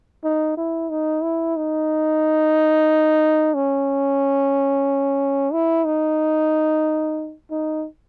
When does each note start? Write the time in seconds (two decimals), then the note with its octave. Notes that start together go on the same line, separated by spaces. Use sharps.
0.24 D#4
0.57 E4
0.90 D#4
1.23 E4
1.56 D#4
3.54 C#4
5.53 E4
5.86 D#4
7.51 D#4